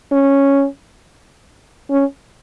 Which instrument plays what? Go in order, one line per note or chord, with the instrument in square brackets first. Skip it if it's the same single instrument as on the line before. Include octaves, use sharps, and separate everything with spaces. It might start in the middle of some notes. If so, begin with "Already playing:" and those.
[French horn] C#4
C#4